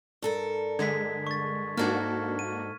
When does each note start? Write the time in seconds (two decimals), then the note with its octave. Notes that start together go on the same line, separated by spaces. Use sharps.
0.22 G2 A4 A#4
0.79 D3 G#3 G#6 B6
1.27 C#6 A6
1.77 G#2 A#3 D4 F#4 A4 F6 G#6
2.39 D#7